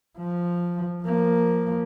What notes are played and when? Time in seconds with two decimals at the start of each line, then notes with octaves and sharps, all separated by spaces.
0.18 F3
1.04 F3 A#3